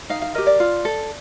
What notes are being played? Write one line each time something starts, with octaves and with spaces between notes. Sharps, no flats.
D#4 F5
F5
G4 A#4 D#5
D5
F4
A4